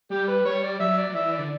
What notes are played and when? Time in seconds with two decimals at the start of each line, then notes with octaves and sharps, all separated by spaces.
0.10 G3 G4
0.28 B4
0.45 G3 C#5
0.63 D5
0.80 F#3 E5
0.97 D5
1.09 F#3
1.14 E3 E5
1.32 D5
1.39 D3